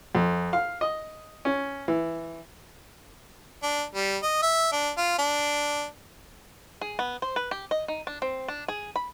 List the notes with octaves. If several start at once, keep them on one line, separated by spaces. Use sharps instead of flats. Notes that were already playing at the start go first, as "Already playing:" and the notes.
F2
F5
D#5
C#4
E3
D4
G3
D#5
E5
D4
F4
D4
G#4
B3
C5
B4
G4
D#5
D#4
D4
C4
D4
G#4
B5